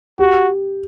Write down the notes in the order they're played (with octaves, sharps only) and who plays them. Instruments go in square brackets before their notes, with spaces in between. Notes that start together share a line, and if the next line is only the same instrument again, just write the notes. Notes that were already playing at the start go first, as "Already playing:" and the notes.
[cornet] F#4 [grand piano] G4